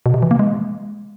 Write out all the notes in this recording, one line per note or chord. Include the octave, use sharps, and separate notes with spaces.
B2
C3
E3
A#3
G#3